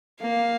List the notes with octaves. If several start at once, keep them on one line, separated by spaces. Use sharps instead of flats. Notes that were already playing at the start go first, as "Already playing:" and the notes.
A#3 F5